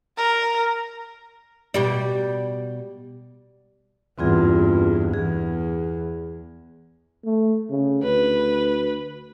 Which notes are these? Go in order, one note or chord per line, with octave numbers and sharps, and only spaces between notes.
A#4
B2 G3 D5
E2 G2 C4 F4 G#4
E2 G#4
A3
C#3
D2 B4